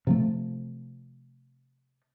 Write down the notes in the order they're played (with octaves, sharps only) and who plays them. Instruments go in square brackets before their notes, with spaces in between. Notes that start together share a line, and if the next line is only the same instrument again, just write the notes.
[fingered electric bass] C3 F3 A3